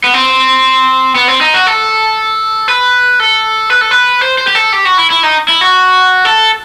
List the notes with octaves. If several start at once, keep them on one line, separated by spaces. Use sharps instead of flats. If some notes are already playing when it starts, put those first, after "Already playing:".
B3
C4
B3
C4
D#4
F#4
A4
B4
A4
B4
A4
B4
C5
C5
G4
A4
G4
F#4
E4
E4
D#4
E4
F#4
A4